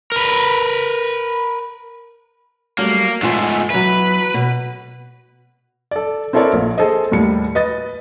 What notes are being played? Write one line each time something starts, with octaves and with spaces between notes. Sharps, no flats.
A#4 B4
F#3 G3 A3 A#3
E2 G#2 A3 F4 G#5
E2 F#3 B4
B2
A4 D5
C4 E4 A4 A#4 C#5 D5
A#1
G#4 A4 C5 D#5
D#2 A2 G3 C#7
B4 D#5 A6